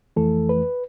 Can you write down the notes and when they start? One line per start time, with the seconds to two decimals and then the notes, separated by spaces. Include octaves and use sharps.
0.16 F2 E3 A3 A4
0.49 B4